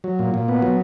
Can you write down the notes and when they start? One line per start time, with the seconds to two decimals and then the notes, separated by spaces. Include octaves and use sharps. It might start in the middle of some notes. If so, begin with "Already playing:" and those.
0.04 F#3
0.19 A#2
0.34 A#2
0.48 B3
0.62 F#3